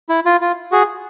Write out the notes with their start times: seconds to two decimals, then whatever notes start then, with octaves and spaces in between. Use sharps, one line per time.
0.09 E4
0.26 F4
0.41 F4
0.71 F#4 G#4